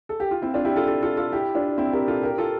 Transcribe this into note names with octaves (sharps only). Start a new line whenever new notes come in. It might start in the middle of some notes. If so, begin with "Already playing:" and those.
A4
G4
F4
C4 E4
D4 F4
E4 G4
F4 A4
F4 A4
F4 A4
F4 A4
E4 G4
D4 F4
C4 E4
G4 A#4
F4 A4
G4 A#4
F4 A4